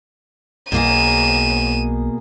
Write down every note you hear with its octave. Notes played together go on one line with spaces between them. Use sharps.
B1 B2 A#3 G#4 D#7 E7